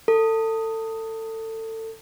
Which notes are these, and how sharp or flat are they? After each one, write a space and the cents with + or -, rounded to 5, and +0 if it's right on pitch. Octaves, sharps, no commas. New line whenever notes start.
A4 +25